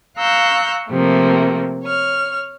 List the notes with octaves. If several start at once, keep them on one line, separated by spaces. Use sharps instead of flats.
F5 A#5 C#6 E6 F#6 G6
C3 F3 A3 A#3
C#5 F6